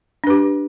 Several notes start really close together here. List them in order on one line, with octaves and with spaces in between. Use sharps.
D4 B4 G4